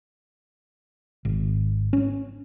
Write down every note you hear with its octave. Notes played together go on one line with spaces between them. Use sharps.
G#1
C#4